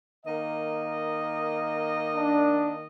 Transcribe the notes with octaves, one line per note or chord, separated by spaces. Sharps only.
D#3 A#3 D#5
D4